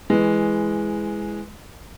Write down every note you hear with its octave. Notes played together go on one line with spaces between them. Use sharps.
E3 G#3